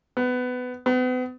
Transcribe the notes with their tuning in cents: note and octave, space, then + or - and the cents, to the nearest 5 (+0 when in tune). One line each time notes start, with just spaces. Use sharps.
B3 +20
B3 +40